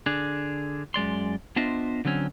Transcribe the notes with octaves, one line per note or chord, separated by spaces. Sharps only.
D3 D4 G#4
F#2 G#3 D5 C6
B3 D4 F4 C5 D#5 E5
D3 F#3 C4 C#4